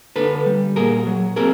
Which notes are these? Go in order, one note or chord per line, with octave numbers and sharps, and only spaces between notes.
D3 A4 B4
G3
A#2 G#4 A#4
F#3
C4 G#4 A#4